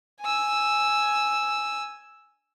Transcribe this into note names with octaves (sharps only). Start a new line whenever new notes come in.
G#5 E6